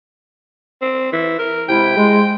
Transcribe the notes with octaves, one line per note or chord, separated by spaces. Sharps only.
C4
E3
A#4
C3 G#3 E4 G5
G#3